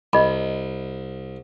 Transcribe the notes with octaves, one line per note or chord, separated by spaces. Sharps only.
C2 D#5 B5